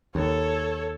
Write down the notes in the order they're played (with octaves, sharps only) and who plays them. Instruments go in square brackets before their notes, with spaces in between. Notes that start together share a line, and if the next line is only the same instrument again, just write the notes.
[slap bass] D#2 [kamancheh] A4 C#5